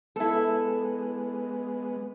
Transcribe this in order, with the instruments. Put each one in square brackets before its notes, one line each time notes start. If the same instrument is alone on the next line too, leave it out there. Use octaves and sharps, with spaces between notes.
[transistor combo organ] G#3 B3 [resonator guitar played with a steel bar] E4 A4